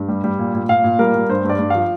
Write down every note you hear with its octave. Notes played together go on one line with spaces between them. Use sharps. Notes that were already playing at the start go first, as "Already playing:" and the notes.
Already playing: G2
G3
G3
A#2
A#2
A#2 F5
A#2
G3 A#4
G3
G2 C5
G2 D5
G2
F3 F5